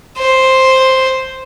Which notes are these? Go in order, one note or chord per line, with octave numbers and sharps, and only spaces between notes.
C5